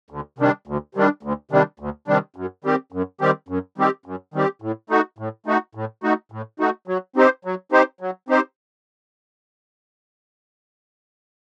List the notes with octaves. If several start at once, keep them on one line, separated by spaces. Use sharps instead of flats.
D2
C3 D#3 G3 D4
D2
C3 D#3 G3 D4
D2
C3 D#3 G3 D4
D2
C3 D#3 G3 D4
F#2
D#3 G3 C4 G4
F#2
D#3 G3 C4 G4
F#2
D#3 G3 C4 G4
F#2
D#3 G3 C4 G4
A2
A3 D#4 F#4
A2
A3 D#4 F#4
A2
A3 D#4 F#4
A2
A3 D#4 F#4
F#3
C4 D#4 G4 C5
F#3
C4 D#4 G4 C5
F#3
C4 D#4 G4 C5